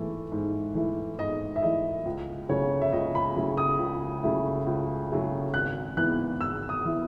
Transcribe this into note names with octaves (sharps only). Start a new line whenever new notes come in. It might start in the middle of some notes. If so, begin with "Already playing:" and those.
Already playing: G#2 E3 A3 E4
G#2
E3 A3 E4
G#2 D#5
E5
E3 A3 E4 D#5
C#2
C#3 F#3 A3 E4 C#5
E5
C#2 D#5
B5
C#3 F#3 A3 E4
D#6
C#2
C#3 F#3 A3 E4
C#2
C#3 F#3 A3 E4
G#1 F#6
G#2 E3 B3 E4 F#6
G#1 E6
D#6
E3 B3 E4